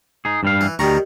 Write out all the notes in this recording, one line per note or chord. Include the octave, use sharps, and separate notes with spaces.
D#4 G#4
G2 G3 F5
E3
D2 D#3 G3 A#5 C#6